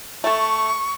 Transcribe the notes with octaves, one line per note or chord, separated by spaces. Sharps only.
A3 A4 C#6